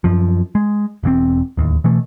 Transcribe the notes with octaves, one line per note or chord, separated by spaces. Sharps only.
F#2 F3
G#3
E1 E2 C4
D1 D#2
B2 E3 A3